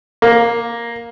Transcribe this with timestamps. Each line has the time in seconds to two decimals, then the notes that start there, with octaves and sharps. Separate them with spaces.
0.22 A#3